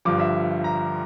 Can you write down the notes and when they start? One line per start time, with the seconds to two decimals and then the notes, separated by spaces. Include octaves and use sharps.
0.05 G1 G2 F3 D6
0.20 E5
0.64 A#5